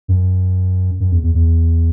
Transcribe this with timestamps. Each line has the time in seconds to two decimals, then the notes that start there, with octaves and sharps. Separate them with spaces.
0.08 F#2
1.00 F#2
1.12 E2
1.23 E2
1.34 E2